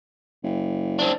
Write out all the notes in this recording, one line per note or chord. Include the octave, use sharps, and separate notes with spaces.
F#1
C4 D4